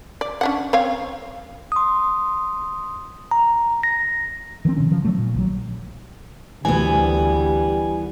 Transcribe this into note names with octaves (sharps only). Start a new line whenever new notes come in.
D5
C#4 D4 F#5
C4 C#5 F5
C6 D#6
A#5
A#6
D#3 F3 B3 C4
C3 D#3 C#4
D3 F3
F3 F#3 A3
A#2
A#1 D#3 F#3
D2 E3 G3 B3 G#5